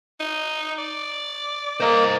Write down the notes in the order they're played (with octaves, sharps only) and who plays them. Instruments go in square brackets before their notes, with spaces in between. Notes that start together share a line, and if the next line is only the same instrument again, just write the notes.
[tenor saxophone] D#4
D5
[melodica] A#3 [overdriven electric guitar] C5 D#5